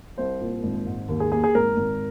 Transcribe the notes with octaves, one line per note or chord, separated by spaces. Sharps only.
C2 C5
A#2
G#1
G#2
D#2
G#4
A#3 G#4
G#4
G#1 A#4
G#1